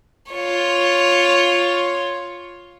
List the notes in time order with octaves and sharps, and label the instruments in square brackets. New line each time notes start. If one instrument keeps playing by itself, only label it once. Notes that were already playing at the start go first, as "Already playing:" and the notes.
[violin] F4 C#5